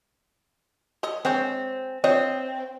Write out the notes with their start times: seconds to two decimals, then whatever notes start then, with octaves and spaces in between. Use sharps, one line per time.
1.03 A4 C#5 D#5
1.25 G#3 C4 G#4 C#5
2.04 C4 F4 C#5 D#5